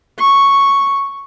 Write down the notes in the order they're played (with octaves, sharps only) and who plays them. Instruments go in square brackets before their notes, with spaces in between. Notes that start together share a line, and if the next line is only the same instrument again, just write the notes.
[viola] C#6